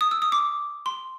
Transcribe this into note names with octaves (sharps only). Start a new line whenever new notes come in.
D#6
E6
D#6
D6
C6